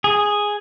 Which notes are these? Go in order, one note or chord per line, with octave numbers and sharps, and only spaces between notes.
G#4